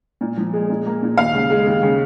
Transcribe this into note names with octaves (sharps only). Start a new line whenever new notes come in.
A#2
F3
G#3
A#2
A#3
A#2
D#2 F5
C#3
G#3
D#2
C#3